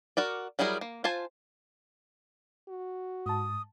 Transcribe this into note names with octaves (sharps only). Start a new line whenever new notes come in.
F#4 A#4 D5
F#3 G3 E4 G#4 A#4
A#3
F4 C5 G#5 A5
F#4
G#2 A5 D#6